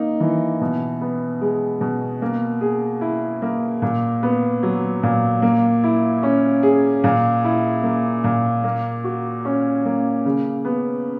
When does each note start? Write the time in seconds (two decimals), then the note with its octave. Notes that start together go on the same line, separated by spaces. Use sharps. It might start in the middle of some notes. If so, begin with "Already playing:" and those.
Already playing: A#3 D#4
0.20 E3
0.61 B2
1.01 B3
1.41 G#3
1.81 B2
2.22 A#3
2.61 G#4
3.01 E4
3.42 A#3
3.82 A#2
4.23 B3
4.63 F#3
5.03 A#2
5.42 A#3
5.84 E4
6.23 C#4
6.63 G#4
7.04 A#2
7.44 E4
7.83 A#3
8.24 A#2
8.64 A#3
9.04 F#4
9.45 C#4
9.85 A#3
10.25 C#3
10.65 B3